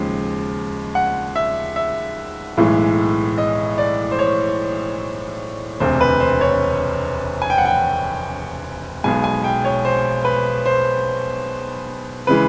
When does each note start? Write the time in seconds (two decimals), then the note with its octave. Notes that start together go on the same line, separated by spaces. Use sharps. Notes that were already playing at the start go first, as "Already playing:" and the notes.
Already playing: D#2 C#3 F3 G#3
0.95 F#5
1.36 E5
1.76 E5
2.57 B1 A2 E3 G#3
3.38 D#5
3.78 D5
4.11 C5
4.19 C#5
5.80 E1 D2 C3 C5
6.01 B4
6.20 C5
6.41 C#5
7.42 G#5
7.50 G5
7.58 F#5
7.65 G5
9.04 B1 B2 G#3 G#5
9.24 G#5
9.44 G5
9.65 C#5
9.85 C5
10.25 B4
10.66 C5
12.27 C#3 E3 G#3 B4